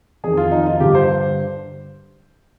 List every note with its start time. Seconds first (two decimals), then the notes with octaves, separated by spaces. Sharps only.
0.24 F2 D#3 G#4
0.37 F4
0.52 D#4
0.66 F4
0.80 G2 D3 G4
0.95 C5